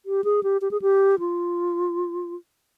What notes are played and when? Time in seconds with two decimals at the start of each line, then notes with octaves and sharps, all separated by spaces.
0.06 G4
0.24 G#4
0.43 G4
0.61 G4
0.71 G#4
0.82 G4
1.19 F4